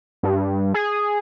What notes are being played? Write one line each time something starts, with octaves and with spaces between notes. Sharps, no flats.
G2
G#4